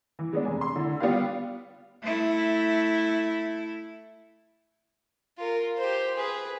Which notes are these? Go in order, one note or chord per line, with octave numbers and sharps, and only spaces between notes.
E3
G#3 B3 D4
F1 G#5
C6
D3 E4
G3 B3 F4 G4 B4 F5
A3 E4
F4 A#4
G4 C5
G#4 B4